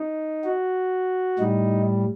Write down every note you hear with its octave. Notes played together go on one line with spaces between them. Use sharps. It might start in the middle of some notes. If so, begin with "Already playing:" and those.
Already playing: D#4
F#4
A2 G3 D#4